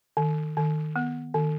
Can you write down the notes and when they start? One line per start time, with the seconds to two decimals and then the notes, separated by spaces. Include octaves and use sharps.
0.17 D#3
0.57 D#3
0.96 B3
1.34 D#3